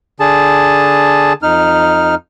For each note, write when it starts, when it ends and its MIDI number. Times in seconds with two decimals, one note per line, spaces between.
0.20 1.33 50
0.20 1.33 68
0.20 1.33 81
1.42 2.15 41
1.42 2.15 63
1.42 2.15 89